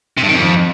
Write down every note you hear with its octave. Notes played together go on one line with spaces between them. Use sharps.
C3
G2
D#3
F2